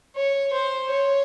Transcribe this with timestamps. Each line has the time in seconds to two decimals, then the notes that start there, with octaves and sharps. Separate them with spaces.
0.16 C#5
0.53 C5
0.91 C#5